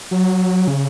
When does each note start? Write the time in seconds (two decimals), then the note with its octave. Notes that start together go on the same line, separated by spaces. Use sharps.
0.11 F#3
0.68 C#3